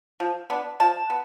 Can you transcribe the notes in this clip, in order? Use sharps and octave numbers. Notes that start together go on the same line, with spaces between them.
F3
B3 D4
F3 A5
B3